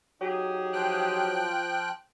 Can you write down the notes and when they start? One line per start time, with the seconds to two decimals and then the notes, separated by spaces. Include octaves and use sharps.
0.21 F#3 D#4 G4 G#4
0.73 F3 G5 F#6